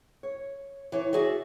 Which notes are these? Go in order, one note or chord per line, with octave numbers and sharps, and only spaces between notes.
C#5
E3 C#5
F#4 G#4 D5 E5